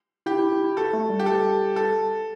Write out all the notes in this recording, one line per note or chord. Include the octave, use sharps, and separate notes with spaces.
E4 G4
E4
E4
E4
F#4 A4
A3
G3
G4
A4
A4